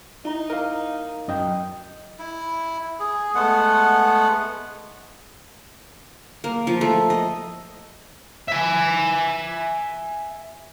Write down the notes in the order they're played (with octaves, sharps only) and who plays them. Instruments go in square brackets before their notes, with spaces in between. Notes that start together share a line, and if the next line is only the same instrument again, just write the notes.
[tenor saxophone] D#4 [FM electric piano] E4 A#5
[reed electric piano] A#4 F5
F#2 D#5 G5
[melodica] E4
G#4
G#3 A3 B3 F#5
[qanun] A#3
F3
A3
D#5
[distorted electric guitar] E5 G#5